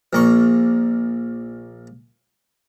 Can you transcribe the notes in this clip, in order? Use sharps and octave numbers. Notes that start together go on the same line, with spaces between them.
A#1 A#3 C#6